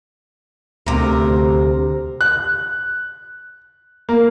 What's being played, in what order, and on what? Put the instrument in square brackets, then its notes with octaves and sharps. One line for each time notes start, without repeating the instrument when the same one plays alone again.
[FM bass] D2 [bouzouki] C3 A#4
[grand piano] F#6
A#3